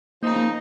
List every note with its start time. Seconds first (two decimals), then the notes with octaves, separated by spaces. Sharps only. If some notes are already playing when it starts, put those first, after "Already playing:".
0.22 C#3 F3 A#3 C4 D#4
0.37 A#3